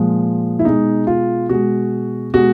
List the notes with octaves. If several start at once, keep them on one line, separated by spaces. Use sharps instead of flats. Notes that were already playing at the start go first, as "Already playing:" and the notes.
Already playing: A#2 F3 G#3
E4
B2 G#3 D#4
F4
B2 G#3 F#4
B2 G#3 F#4